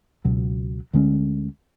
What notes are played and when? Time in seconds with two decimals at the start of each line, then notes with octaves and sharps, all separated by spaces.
0.25 C#2 B2 F#3
0.93 D2 D3 G#3 C#4